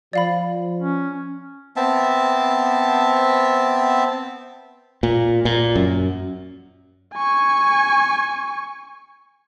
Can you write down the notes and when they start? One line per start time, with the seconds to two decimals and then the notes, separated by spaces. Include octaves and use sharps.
0.13 F3 D5 F5 B5
0.79 C#4
1.76 B3 C4 E5 A5
5.03 A#2
5.45 A#2
5.76 F#2
7.14 G#5 C#6